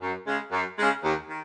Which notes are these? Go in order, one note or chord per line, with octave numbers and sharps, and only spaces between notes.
F#2
C#3 G#3
F#2
C#3 G#3
D#2
D#3